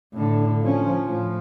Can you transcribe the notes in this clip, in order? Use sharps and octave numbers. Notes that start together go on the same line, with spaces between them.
A2 D3
F3 C#4
A2 F3